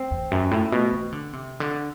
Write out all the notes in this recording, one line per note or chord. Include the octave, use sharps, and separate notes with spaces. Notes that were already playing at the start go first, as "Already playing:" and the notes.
Already playing: C4
E2
F#2
A2
B2
E3
D3
C3
D3